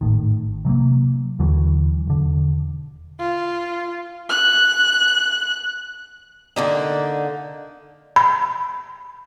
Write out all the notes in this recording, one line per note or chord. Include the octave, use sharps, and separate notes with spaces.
G#1 A2 D#3
C3 F#3 G3 A#3
D#2 D3 E3 F#3
E1 D3
F4
F#6
D3 A#3 D#4
B5